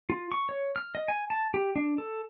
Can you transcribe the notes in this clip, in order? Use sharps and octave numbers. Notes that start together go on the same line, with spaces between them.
F4
C#6
C#5
F6
D#5
G#5
A5
G4
D4
A4